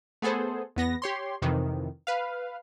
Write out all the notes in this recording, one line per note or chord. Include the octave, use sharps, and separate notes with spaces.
A3 B3 G#4 A4 C5
E2 B3 A#6
G4 C#5 C6
F2 C3 D#3 E3
B4 F5